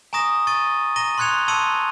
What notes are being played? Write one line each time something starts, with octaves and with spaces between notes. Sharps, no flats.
G#5 A#5 C#6 D#6 A#6 E7
C#6 A6 D#7
A#5 A#6 D#7 G7
C6 C#6 F#6 G#6 C#7 F7
A5 C6 C#6 E6 C#7 D#7